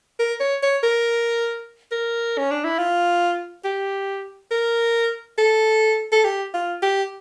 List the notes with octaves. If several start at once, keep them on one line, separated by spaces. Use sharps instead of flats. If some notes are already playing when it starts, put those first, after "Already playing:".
A#4
C#5
C#5
A#4
A#4
C#4
D4
E4
F4
G4
A#4
A4
A4
G4
F4
G4